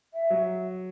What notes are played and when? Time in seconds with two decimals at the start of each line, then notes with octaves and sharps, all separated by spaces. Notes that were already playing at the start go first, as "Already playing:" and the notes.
0.14 E5
0.30 F#3